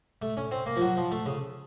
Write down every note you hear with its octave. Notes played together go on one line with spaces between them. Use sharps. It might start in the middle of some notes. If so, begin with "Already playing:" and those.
A3
C#4
C4
A#3
F3
F#3
F3
A3
C#3